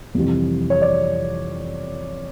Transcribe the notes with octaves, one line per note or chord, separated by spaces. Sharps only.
F2 C3 E3 G3
C#5
D5